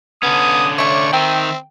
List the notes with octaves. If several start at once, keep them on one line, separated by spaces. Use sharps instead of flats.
D3 B3 C#4 D#6
A3 C#5 D5 E5
D#3 C4 E5 G5